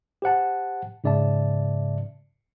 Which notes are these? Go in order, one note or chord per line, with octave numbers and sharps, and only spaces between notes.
G4 C5 F#5 A5
G#2 C#3 D5 E5 A5